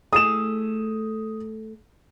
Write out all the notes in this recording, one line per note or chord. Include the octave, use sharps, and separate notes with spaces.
A3 E4 G#4 D#6 E7